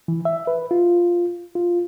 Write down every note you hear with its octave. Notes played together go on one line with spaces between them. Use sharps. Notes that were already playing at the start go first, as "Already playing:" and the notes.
E3
E5
B4
F4
F4